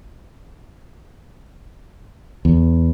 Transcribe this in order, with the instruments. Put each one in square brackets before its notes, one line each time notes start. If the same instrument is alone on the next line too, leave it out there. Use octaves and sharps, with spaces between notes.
[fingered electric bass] E2